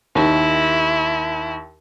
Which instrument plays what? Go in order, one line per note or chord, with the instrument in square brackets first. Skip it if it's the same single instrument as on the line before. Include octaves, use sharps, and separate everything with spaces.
[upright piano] D#2 D#3 [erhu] E4